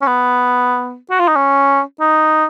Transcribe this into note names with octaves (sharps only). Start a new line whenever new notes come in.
C#4
B3
F#4
F4
D#4
C#4
D#4